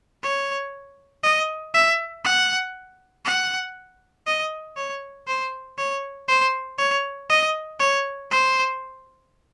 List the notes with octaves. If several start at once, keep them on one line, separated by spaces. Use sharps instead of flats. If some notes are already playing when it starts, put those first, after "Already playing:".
C#5
D#5
E5
F#5
F#5
D#5
C#5
C5
C#5
C5
C#5
D#5
C#5
C5